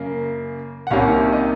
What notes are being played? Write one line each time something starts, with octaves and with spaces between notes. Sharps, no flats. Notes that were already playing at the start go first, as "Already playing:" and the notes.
Already playing: F#2 C#3 A#3
F#5
C2 C3 D#3 A#3 C#4 F5
D#5